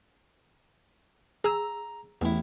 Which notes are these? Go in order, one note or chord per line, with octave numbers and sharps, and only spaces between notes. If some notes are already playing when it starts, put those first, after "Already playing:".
G#4 A#5 E6
A1 E2 E4